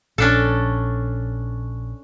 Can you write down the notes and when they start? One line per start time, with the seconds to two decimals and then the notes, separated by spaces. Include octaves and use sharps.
0.18 A#1 C#4 D4 A4